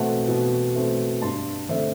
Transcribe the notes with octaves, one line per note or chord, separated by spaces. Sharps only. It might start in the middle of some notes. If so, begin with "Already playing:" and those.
Already playing: B2 A3 C4 F#5 A5
B2
A3 C4
G2 A5 C6
D3 A3 C4 C5 E5